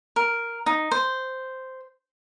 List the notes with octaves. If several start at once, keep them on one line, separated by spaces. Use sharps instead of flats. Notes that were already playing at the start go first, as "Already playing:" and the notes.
A#4
D#4
C5